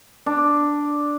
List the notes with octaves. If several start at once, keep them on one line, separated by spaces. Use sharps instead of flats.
D4